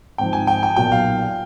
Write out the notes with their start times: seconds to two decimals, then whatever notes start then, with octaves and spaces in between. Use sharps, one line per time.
0.18 G#1 G#2 F3 G5
0.33 G#5
0.47 G5
0.63 G5
0.76 B1 A#2 F#3 G5
0.92 F5